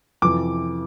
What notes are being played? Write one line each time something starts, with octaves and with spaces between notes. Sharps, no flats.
F2 C3 E3 D6